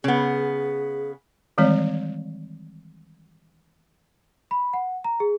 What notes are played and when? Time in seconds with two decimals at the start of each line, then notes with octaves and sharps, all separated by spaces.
0.04 C#3 B3 G#4
1.58 D#3 E3 G3 G#3 C4 C#5
4.51 B5
4.73 F#5
5.04 A#5
5.20 G#4